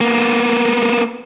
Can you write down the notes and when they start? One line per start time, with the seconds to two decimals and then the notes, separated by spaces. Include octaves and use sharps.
0.01 A#3 B3